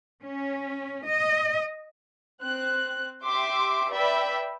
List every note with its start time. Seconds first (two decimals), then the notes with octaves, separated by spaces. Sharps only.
0.22 C#4
1.08 D#5
2.40 C4 F#6
3.26 G4 E5 C6 D6
3.91 B4 D5 E5 G5 B5